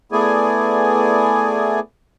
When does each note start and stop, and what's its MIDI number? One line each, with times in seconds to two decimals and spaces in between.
0.12 1.80 57
0.12 1.80 59
0.12 1.80 64
0.12 1.80 68
0.12 1.80 74
0.12 1.80 80